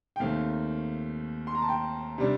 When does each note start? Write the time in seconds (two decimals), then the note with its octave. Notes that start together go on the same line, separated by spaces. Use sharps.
0.16 G5
0.20 D#2 D#3 A3 C4 F5
1.47 C6
1.55 A#5
1.62 A5
1.69 G5
2.18 C3 G3 D4